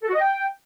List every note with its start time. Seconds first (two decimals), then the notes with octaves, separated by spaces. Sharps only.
0.02 A4
0.08 F#4
0.14 D#5
0.19 G5